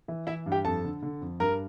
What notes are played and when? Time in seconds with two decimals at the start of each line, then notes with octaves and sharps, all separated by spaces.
0.08 E3
0.27 E3 E4 E5
0.46 G2
0.52 G4 G5
0.65 F2 A4 A5
0.84 D3
1.03 D3
1.21 F2
1.40 G2 A#4 A#5